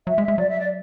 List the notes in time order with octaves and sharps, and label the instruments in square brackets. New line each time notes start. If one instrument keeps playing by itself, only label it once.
[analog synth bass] F#3 [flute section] E5
[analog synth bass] G#3
G#3
[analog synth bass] F#3 [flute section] D5
[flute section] E5
D5